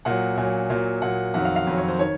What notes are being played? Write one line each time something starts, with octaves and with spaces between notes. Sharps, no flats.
A#2 F#3 F#5
A#2 F#3 G#5
A#2 F#3
A#2 F#3 F#5
F2 D#3 F#3 F#5
F5
F5
F2 D#3 F#3
C#5
C5
D#3 C#5